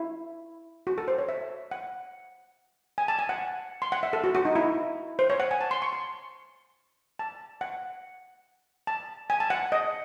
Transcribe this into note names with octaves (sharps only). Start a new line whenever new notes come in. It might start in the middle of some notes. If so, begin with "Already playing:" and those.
Already playing: E4
F#4
A4
C5
C#5
E5
F#5
G#5
A5
G#5
F#5
C6
F#5
E5
A4
F#4
F#4
D#4
E4
C5
C#5
F#5
G#5
A5
C6
C#6
C6
A5
F#5
A5
G#5
A5
F#5
D#5